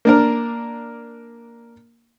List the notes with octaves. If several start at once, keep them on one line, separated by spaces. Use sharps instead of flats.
A#3 D4 A#4